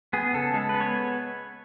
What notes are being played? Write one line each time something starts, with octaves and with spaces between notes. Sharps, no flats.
B3 G#4
C#3 A4
G#3 A4
B4
B3
C#5